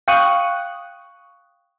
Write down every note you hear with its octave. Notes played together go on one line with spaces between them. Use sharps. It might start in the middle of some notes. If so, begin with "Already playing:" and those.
F5 G5 C#6 D#6 F#6